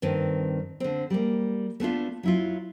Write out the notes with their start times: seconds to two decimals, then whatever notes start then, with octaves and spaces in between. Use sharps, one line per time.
0.02 G2 D#3 C4
0.80 D3 C4
1.10 G3 A#3
1.80 A3 B3 D4 F4
2.23 F#3 E4 F4